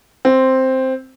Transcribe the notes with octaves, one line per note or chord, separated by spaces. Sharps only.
C4